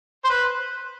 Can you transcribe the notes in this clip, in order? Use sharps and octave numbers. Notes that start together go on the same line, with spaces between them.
C5
B4